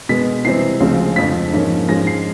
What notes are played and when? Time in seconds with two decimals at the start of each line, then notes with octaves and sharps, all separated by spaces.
0.09 B2 G#3 B3 B6
0.45 C3 E3 G3 C4 C7
0.80 D2 C#3 F3 G#3 C4
1.16 F2 D3 F3 B6
1.53 G#2 F3 A#3 C#4
1.89 G#2 F3 G#3 C#4 A#6
2.07 C7